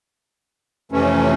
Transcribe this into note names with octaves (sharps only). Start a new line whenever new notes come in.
F2 C3 E3 A3 C#4